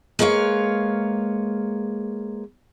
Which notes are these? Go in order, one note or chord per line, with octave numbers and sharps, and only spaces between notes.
G#3 A#3 B4 C#5 F5